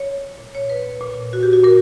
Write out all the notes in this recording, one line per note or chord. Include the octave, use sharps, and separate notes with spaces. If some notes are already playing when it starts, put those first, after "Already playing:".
Already playing: C#5
A#2
C#5
B4
A#2
F#4
G4
F#4
A#2 A#4